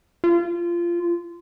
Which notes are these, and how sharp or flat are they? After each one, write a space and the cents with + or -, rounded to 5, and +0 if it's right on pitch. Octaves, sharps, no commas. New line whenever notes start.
F4 -20